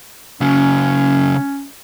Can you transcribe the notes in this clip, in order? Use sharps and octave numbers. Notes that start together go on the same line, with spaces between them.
C#3 F#3 C#4